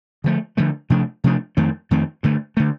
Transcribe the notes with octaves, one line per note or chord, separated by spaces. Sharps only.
D3 F3 A3
D3 F3 A3
C3 F3 A3 D4
C3 F3 A3 D4
F2 D#3 A3 C4
F2 D#3 A3 C4
G2 D3 A3
D3 A3